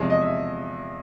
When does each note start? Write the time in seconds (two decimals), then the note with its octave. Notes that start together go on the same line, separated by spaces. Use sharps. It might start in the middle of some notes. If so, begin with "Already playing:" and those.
Already playing: E2 C3 F3 G#3
0.10 D#5
0.21 E5